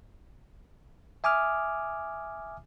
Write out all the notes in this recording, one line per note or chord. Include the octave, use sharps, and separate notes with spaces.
E5 G#5 D6 D#6 F6